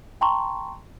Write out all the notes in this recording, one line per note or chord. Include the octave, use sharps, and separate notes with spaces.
G5 A5 A#5 C6 C#6